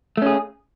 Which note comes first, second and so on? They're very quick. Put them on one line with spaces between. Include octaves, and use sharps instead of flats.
A3 C#4 G#4